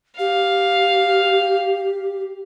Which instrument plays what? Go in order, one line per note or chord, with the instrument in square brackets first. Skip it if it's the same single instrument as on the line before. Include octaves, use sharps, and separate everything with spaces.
[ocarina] G4 [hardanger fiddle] F5